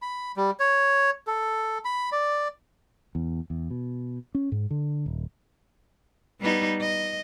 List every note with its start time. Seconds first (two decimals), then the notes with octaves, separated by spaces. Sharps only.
0.02 B5
0.36 G3
0.60 C#5
1.27 A4
1.85 B5
2.12 D5
3.15 E2
3.50 E2
3.70 B2
4.35 C#4
4.52 G#2
4.70 D3
5.06 D#1
6.40 G3 B3 D#4
6.81 D#5